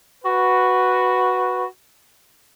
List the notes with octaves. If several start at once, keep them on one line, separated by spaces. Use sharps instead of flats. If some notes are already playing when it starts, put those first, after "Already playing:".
F#4 B4